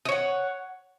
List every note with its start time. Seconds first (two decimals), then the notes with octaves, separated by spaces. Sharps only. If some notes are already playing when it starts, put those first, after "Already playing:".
0.05 D#5
0.09 C#5
0.12 F#5